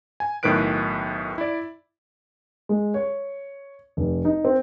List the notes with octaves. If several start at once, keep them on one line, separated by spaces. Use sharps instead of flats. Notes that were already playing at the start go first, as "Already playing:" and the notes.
G#5
B1 A2 D#3 B4 F#6 D7
E4 D5
G#3
C#5
F1
D#4
C4